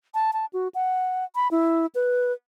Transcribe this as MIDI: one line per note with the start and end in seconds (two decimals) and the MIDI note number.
0.14 0.31 81
0.33 0.46 81
0.53 0.68 66
0.75 1.25 78
1.35 1.48 83
1.51 1.86 64
1.95 2.32 71